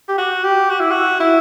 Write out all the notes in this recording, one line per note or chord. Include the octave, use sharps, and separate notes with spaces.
G4
F#4
G4
F#4
E4
F#4
E4